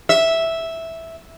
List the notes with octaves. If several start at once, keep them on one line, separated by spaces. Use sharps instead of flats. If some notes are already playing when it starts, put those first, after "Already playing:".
E5